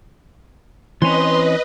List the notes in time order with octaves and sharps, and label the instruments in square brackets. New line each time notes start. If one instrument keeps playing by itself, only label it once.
[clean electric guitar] E3 C4 C#4 [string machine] B4 D#5 [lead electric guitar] C6